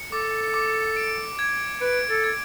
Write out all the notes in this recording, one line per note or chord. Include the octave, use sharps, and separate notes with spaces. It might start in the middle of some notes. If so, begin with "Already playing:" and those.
Already playing: C#7
A4 D6
D6
D7
G#6
B4 D7
A4
G#6